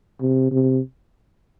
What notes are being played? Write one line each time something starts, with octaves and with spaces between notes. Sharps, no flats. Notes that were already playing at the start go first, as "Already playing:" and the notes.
C3
C3